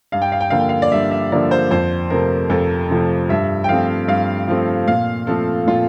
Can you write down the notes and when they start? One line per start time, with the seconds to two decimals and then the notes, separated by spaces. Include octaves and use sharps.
0.12 G2 F5
0.22 G5
0.32 F5
0.40 G5
0.50 D3 F3 A#3 F5
0.60 G5
0.69 F5
0.82 D5
0.92 G2 E5
1.11 E5
1.32 D3 F3 A#3 D5
1.51 C5
1.71 F2 C5
2.10 C3 F3 A3 A#4
2.50 F2 A4
2.90 C3 F3 A3
3.29 G2 E5
3.64 G5
3.69 F3 A3 C4 F5
4.08 G2 F5
4.48 F3 A3 C4
4.87 A#2 F5
5.27 F3 A3 C4 A4
5.67 A#2 F4